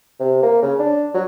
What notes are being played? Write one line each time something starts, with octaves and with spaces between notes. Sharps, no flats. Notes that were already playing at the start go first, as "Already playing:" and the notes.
C3
A#3
C#3
D4
F#3